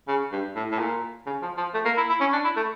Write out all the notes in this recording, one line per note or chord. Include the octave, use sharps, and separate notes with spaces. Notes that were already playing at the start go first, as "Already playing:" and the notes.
C#3
G2
A2
A2
A#2
C#3
F3
F3
A3
A#3
E4
E4
C#4
D4
E4
A3